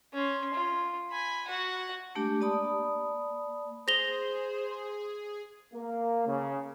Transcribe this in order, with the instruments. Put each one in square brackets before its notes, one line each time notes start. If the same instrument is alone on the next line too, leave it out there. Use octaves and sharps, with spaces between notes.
[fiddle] C#4 C6
F4
G#5 B5
F#4 F#5
[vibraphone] G#3 A3 D4 G4
A#3 D5 A5 B5 D#6
[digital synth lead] G#4 [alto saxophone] C5 [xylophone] A#6 F7 G7
[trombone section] A#3
C#3